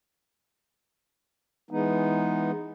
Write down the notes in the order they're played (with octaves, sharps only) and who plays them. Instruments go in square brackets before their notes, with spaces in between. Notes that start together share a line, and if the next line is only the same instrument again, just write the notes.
[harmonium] E3 G#3 B3 D#4